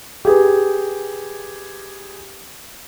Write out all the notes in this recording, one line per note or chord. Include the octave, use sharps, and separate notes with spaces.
G4 G#4 B4